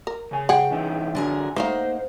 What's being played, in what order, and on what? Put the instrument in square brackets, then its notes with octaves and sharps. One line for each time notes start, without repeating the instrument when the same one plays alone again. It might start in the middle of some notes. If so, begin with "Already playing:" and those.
[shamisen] A#4
[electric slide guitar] C#3 G#5
[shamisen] G#4 F#5 [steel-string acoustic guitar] G5
[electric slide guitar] E3 C#4 D#4
[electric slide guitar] F#2 F#3 D4 [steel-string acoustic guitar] D3 G#4 A#4
[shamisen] A3 F5 [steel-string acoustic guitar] A#3 D#4 F#5 [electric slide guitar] C5